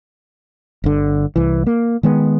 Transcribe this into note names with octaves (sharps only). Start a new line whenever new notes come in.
G1 D3
C2 E3
A#3
D#3 G#3 B3